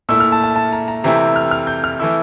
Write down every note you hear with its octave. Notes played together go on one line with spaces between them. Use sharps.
A#2 A3 E4 E6
F6
A5
A5
A5
A#5
A#5
C3 E3 A3 C4 E4 A#5
F6
F6
G6
F6
E3 A3 E4 E6